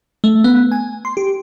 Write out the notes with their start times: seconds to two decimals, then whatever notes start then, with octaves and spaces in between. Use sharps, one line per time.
0.24 A3
0.44 B3
0.72 G#5
1.05 C6
1.17 G4